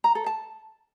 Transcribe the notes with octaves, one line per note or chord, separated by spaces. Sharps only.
A#5
A4
A5